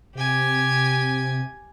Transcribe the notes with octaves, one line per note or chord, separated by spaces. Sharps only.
C3 G4 G#5